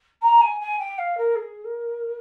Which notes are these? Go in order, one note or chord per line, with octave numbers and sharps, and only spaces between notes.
A#5
G#5
G#5
G5
F5
A#4
G#4
A#4